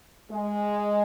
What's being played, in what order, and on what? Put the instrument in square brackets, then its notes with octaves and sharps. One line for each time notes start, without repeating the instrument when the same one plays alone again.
[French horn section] G#3